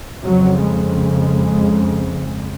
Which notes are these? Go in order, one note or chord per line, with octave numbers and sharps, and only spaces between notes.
F2 C#3 F#3
G#3